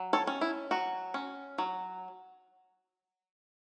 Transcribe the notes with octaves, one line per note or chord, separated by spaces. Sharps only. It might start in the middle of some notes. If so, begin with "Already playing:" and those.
Already playing: F#3
A4 C#5
C#4
E4
F#3 F#4
C#4
F#3